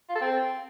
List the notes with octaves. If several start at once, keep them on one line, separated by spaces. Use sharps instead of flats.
F4
A4
C4